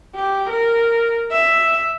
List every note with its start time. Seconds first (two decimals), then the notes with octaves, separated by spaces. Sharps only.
0.16 G4
0.49 A#4
1.31 E5